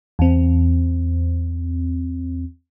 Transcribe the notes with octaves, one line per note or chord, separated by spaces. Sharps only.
E2 C4